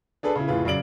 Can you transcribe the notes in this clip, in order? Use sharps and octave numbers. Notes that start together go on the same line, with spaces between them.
D4 G#4 A4 B4
C#3 E4
F1 A2 F4 G#4 B4
F#2 C#3 D5 D7 F#7